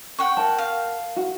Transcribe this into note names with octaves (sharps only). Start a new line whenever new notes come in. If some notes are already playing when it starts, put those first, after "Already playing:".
F#5 G5 C#6
A#4 A5
F5
F#4